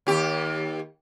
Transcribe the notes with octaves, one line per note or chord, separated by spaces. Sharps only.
D#2 G4